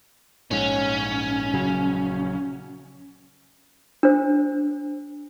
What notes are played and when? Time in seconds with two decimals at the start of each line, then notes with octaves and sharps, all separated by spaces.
0.51 A#1 G#2 C#4
1.54 A#1 C#3 F#3
4.03 D4 C5